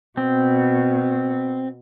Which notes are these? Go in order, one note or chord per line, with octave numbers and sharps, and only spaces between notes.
B2 C4